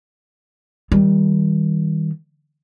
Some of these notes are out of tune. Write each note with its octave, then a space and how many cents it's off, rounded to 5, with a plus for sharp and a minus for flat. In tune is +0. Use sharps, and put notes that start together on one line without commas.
D#3 +30 G3 +0